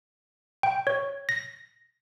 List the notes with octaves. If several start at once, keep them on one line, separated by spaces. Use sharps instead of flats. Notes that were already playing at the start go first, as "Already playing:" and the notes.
G5
C#5
A#6